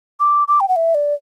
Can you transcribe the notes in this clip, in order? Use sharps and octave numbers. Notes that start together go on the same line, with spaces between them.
D6
D6
G5
F#5
E5
D5